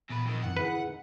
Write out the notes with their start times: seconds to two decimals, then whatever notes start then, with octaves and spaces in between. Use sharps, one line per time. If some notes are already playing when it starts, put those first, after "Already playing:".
0.10 E2 A#2 B4
0.26 F2 D#3
0.44 F#2 E3 C4 F#5
0.57 D3 E4 G#4 B4
0.88 D#4